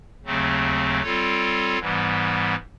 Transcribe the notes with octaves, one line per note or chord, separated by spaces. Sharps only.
D#2 C#3 F#3 A3 C4
G3 C4 F4 A4 C#5
G#2 E3 G3 B3